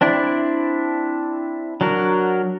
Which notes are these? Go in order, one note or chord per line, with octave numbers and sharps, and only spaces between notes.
C4 D4 E4 D5
F#3 D4 F#4 A#4